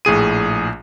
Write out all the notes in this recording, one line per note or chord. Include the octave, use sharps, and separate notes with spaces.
A#1 A2 G#4 D#7